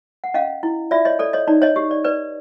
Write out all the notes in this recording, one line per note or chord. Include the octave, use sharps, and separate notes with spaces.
F#5
C#4 D#5 F5
E4
F4 D5 E5
C#5 D#5
A4 D5
C#5 D#5
D#4 D5
C#5 D#5
G4
D5
B4 D5